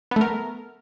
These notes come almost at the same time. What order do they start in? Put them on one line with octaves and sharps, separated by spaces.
B3 A3 A#4